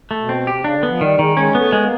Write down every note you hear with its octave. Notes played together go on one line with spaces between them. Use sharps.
A3
B2
C4
C3 G4
C#3 D4
D3
F3 B3
D#3 G3
D#3 G#3
G#3 C#4
A3 B3
G#3
A#3